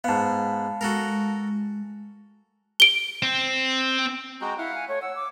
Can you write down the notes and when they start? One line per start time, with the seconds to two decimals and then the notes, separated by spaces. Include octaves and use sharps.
0.04 G#2 B3 F5 A5
0.81 G#3 F#4 A4 A#4
2.80 D7 G7
3.23 C4
4.41 G#3 F#4 G5 A#5
4.58 E4 F5 F#5
4.75 G#5
4.88 A3 C#5
5.02 F#5 E6
5.16 D6